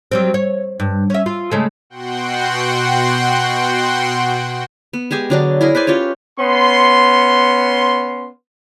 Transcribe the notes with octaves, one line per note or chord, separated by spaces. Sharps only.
F#3 G3 C4
C#5
G2
C#4 E5
F4
C#3 G#3 A3
B2 F#4 F#5 G5 C6
B3
G#3 G4 G#4 G#5
D3 F#3 D4
E4 G#4 A#4 D#5
B4 C5 D5 G#5
C#4 F4 G4 C#5
B3 C#4 C6